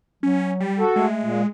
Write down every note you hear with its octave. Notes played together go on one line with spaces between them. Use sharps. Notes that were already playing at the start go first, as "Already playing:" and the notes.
F#3 C#4
G3
F#4 A4
G#3 A3
A#2